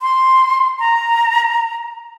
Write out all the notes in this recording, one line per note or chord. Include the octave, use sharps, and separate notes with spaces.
C6
A#5